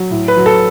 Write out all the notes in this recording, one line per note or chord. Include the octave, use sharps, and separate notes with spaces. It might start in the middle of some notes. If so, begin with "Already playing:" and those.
Already playing: F#3
A2
B4
F#3
A4